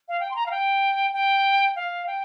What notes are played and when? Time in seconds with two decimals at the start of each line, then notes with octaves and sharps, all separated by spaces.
0.08 F5
0.20 G5
0.31 C6
0.36 A#5
0.46 F5
0.51 G5
1.13 G5
1.76 F5
2.07 G5